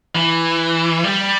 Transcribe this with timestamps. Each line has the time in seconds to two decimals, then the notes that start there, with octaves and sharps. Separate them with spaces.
0.15 E3
1.04 G3